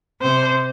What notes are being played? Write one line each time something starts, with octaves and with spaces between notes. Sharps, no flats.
C3 C5